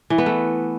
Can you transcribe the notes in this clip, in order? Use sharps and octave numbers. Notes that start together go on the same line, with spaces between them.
E3
B3
A3